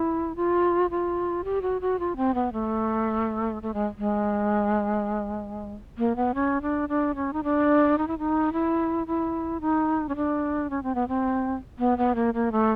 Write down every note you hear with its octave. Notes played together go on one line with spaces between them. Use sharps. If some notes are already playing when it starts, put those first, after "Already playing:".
Already playing: E4
F4
F4
G4
F#4
F#4
F4
C4
B3
A3
A3
G#3
G#3
A#3
B3
C#4
D4
D4
C#4
D#4
D4
D#4
E4
D#4
E4
E4
D#4
C#4
D4
C#4
C4
B3
C4
B3
B3
A#3
A#3
A3